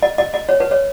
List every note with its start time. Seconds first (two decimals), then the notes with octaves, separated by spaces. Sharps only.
0.03 D#5
0.18 D#5
0.34 D#5
0.49 C#5
0.60 B4
0.71 C#5